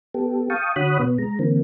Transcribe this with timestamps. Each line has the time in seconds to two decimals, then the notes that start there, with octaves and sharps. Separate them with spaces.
0.14 B3 G4 A4
0.50 F5 G5 A5 C#6 D#6
0.76 D3 F#4 C#5 B5 D#6 F#6
0.99 B2 B3
1.19 G#3 A#5
1.39 D3 E3 A#3 C4